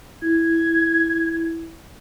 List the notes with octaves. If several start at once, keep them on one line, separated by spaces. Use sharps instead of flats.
E4 G#6